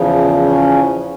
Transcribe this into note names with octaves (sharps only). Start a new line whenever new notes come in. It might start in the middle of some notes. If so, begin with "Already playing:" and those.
Already playing: E2 C#3 F3
C#4